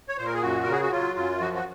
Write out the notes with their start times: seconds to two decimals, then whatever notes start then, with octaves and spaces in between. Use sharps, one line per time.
0.08 C#5
0.18 A#2 C5
0.25 A#4
0.34 G#4
0.42 F#2 F#4
0.63 C#3 A#4
0.72 G#4
0.82 F#4
0.91 F#3 F4
1.16 F#2 F4
1.39 F3 F#4
1.55 F#4